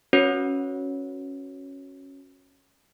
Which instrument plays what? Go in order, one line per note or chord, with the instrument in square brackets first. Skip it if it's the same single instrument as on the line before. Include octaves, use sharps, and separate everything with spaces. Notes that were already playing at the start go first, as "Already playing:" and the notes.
[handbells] C#4 F#4 B4 C#5